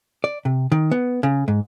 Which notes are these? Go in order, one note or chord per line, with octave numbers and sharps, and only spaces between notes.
D5
C3
D#3
B3
C#3
G#2